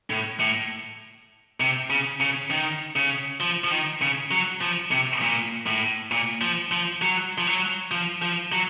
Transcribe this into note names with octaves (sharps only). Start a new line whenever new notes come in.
A2
A2
C3
C#3
C#3
D#3
C#3
F3
F3
D#3
C#3
F#3
F3
C3
A#2
A2
A#2
F3
F3
F#3
F3
F#3
F3
F3
F#3